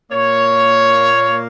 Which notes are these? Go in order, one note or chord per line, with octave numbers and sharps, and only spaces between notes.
A#2 A#3 C#5